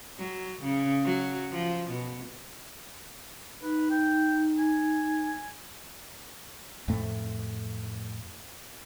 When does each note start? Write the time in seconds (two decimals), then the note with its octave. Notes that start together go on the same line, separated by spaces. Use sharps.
0.18 F#3
0.62 C#3
1.04 F#3
1.51 F3
1.91 B2
3.62 D#4 B4
3.91 G5
4.58 G#5
6.88 F2 A2 A3